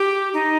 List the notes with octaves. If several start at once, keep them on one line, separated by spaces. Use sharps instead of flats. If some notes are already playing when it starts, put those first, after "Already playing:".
Already playing: G4
D#4